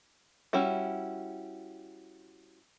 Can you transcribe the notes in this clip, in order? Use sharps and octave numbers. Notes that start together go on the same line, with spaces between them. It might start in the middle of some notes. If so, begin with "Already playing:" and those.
G3 C#4 E4 F#4